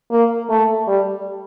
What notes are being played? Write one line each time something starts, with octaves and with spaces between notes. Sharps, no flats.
A#3
A3
G3